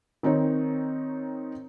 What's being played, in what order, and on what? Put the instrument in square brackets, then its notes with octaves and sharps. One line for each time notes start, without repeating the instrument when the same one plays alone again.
[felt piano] D#3 C4 D#4 C#5